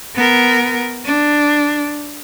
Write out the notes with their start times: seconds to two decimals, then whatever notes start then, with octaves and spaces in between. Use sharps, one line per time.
0.15 B3 A#4
1.05 D4